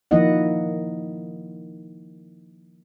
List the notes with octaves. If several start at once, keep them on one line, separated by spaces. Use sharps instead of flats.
D#3 F3 A#3 E4 D#5 F#5